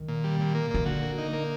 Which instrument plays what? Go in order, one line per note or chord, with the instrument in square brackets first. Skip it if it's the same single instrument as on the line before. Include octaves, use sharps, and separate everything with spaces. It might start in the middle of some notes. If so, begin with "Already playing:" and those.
Already playing: [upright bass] D#3
[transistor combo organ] A#2
G3
A#2
A#3
[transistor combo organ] A#2 [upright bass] D#3
[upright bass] D3 [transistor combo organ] F#4
[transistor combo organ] A#3
D#4
A#3